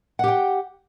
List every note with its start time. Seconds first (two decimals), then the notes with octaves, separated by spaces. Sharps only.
0.19 F#5
0.24 G4
0.28 G5